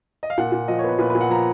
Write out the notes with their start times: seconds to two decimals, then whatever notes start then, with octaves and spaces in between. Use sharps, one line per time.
0.23 D#5
0.30 F5
0.38 A#2 F#5
0.52 A#2
0.68 F3 D#5
0.79 C#5
0.84 B3 B4
0.99 A#2 B4
1.10 B4
1.15 A#2
1.21 F#5
1.30 F3 A#5